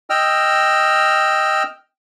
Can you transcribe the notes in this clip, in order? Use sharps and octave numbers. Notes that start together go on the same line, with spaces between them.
D#5 G5 E6 F6